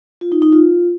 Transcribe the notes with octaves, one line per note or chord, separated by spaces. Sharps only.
F4
D#4
D#4
F4